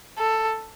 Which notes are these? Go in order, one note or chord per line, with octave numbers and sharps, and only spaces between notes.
A4